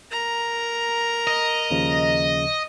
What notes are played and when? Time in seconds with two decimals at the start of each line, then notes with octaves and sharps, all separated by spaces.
0.11 A#4 A#5
1.27 D#5
1.71 D#2 C#3 F3